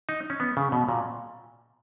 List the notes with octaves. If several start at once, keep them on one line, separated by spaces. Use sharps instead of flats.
D#4
C#4
B3
C#3
B2
A#2